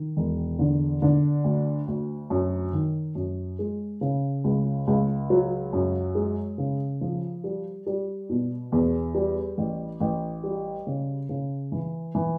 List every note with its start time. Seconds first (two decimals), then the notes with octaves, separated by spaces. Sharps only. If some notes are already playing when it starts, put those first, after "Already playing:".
Already playing: D#3
0.17 E1
0.59 D3
1.02 D3
1.44 D2
1.88 D2
2.30 F#2
2.73 D#3
3.15 F#2
3.59 G#3
4.01 C#3
4.44 C#2
4.87 C#2
5.30 F#3
5.73 F#2
6.15 G#3
6.58 C#3
7.01 F3
7.44 G3
7.86 G3
8.30 B2
8.72 E2
9.14 G3
9.58 A1
10.00 A1
10.43 G3
10.87 C#3
11.29 C#3
11.72 E3
12.15 E3